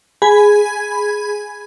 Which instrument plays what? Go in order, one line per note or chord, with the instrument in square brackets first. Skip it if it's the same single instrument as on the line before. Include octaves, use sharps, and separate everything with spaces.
[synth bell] G#4 G#5 B5 G#6